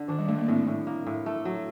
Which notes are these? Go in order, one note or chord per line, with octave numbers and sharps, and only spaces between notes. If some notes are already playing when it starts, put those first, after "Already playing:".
Already playing: D3
D#3 D4
G3
D3 A3
A#3
A2 C4
A2
A#3
A2
A3
F#3